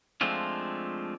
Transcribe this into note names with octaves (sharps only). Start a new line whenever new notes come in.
F3 G#3 A3 C4 D4 F4